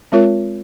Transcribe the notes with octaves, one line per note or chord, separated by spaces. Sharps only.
G#3 C4 F4 A#4 C#5